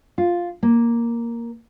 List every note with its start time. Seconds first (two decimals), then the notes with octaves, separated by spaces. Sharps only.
0.18 F4
0.63 A#3